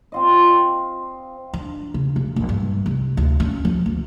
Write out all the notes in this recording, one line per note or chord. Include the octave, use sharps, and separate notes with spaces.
C4 F4 D#5
D4
C#3
E1
A#1
G2
C2
D2
C#4
F3
D2